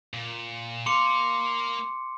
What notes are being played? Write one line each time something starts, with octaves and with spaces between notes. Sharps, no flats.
A#2
A#3 F5 C6 D6 C#7